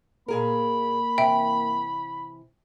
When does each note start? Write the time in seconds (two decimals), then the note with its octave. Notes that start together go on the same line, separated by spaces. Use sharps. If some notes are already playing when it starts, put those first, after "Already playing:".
0.28 A#2 A#3 G#4 A#4 B5
1.18 C3 E3 E5 G5